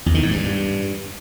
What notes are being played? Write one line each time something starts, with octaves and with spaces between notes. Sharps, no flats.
E2
D#3
G#2
G2